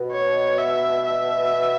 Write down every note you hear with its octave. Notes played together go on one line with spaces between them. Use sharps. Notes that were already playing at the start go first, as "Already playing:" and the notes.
Already playing: B2
C#5
E5
E5